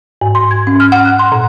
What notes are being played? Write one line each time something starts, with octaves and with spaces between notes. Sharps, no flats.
G#2
C6
G#6
C#4
F6
F#5
F#6
C6
A#2